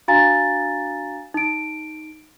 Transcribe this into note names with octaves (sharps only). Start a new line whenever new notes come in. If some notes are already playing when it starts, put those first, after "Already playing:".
D4 F#4 F5 G#5 A#5 A6
D#4 D7